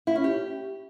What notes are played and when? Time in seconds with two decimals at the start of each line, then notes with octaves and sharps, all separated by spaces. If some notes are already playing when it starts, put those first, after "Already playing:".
0.07 E4
0.16 C#4
0.24 G4